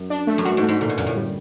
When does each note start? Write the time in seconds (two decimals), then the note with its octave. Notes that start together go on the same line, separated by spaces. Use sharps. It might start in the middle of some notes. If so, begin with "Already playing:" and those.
Already playing: F#2
0.10 D4
0.27 A3
0.38 F#2
0.45 G2 F#4
0.57 G#2
0.63 A3
0.69 G#2
0.81 A#2 D3
0.89 B2
0.98 F#2 A#2
1.07 A2
1.16 G3